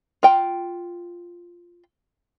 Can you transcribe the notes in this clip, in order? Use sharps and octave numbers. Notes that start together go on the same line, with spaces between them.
F4 G5